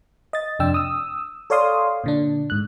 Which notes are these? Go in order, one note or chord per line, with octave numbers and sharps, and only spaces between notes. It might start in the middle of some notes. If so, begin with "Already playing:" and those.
D#5 A6
F2 C3 D4 G5 E6
D#6 E6
A4 C#5 D5 F5 C6 D#6
A#2 D3 D4
G#2 F#6